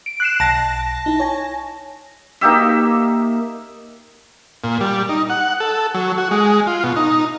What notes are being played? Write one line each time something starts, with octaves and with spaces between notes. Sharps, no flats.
D7
F#6 C7 E7
B1 A5 A#6
D#4 E4
C#5 G#5
A#3 D#4 G4 E5
A#2
G3
D#4
F#5
A4
F#3
F#4
G#3
F4
B2
D#4